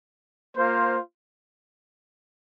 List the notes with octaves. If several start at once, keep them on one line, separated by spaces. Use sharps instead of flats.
A#3 F4 C5